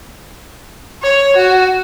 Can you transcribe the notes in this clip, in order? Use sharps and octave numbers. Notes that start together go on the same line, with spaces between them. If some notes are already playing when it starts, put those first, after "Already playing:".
C#5
F#4